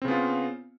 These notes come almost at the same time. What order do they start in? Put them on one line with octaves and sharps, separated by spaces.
C4 C#3 B3 F4